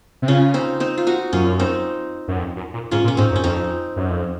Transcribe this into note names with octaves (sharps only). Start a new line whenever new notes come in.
C3
C#3 C#4 F4
C4 D#4
C4 D#4
F4
D#4 F#4
F#2 C#4 F4
C4 D#4
F#2
F2
F#2
A#2
G#2 C#4 F4
A#2
C#4
G#2 C4 D#4
F#2
C#4
F2 C4 D#4
F#2
F2